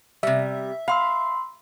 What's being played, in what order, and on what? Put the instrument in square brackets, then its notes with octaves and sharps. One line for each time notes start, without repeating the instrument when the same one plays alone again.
[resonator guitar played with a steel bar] C3 G3 [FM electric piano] E5
[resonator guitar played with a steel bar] F5 [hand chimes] B5 C6 E6